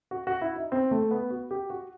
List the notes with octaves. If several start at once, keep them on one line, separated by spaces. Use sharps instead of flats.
F#4
F#4
E4
D#4
C4
A3
B3
F#4
G4
F#4